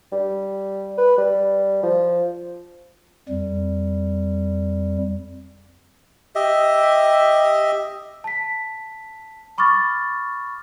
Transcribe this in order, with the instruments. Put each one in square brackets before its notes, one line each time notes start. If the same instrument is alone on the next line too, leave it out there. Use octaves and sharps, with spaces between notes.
[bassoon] G3
B4
G3
F3
[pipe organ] F2 G3
[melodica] G4 D#5 E5
[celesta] A5 B6
B5 C#6 D6 F6 A6